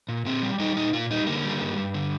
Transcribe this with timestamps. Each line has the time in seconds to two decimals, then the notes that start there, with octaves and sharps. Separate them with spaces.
0.09 A#2
0.25 A#2 C4
0.42 G3
0.59 G3 D#4
0.76 A#2 D#4
0.93 A#2 F4
1.11 G3 D#4
1.27 D3 A#3
1.45 G3
1.61 G2
1.77 G2
1.94 D3